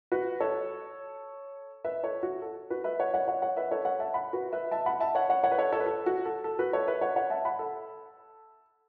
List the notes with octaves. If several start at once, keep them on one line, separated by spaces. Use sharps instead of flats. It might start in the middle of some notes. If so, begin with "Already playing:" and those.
F#4 B4
A4 C#5
B4 E5
A4 C#5
F#4
A4
F#4 B4
B4 E5
C#5 F#5
C#5 F#5
C#5 F#5
C#5 F#5
B4 E5
A4 C#5
C#5 F#5
E5 A5
F#5 B5
F#4 B4
B4 E5
E5 A5
F#5 B5
E5 A5
C#5 F#5
C#5 F#5
C#5 F#5
B4
A4 C#5
A4 C#5
B4
A4
F#4
A4
A4
F#4 B4
A4 C#5
B4 E5
C#5 F#5
C#5 F#5
E5 A5
F#5 B5
A4